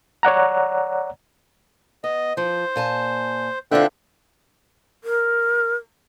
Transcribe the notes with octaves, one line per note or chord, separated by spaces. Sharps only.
C#5 D5 F#5 A#5
B3 D#5
F3 C5
A#2 G#5 A5
D3 B3 C4 F4 E5 G5 F#6
A#4